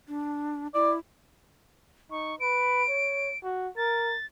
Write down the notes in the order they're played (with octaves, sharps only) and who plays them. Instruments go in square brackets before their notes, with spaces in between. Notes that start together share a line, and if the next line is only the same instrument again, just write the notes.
[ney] D4
[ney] E4 [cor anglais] D5
[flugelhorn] D#4 [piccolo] C#6
[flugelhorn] B4 [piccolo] D7
[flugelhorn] C#5
F#4
[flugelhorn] A#4 [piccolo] A6